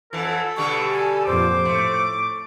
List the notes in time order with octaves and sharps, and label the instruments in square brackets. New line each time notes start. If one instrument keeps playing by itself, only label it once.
[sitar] F2 E3 [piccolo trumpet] A4
[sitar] B2 D3 G3 [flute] C#6
[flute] G#5
[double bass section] F2 A#2 [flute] C5 [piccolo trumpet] D6
[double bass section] A2 [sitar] A3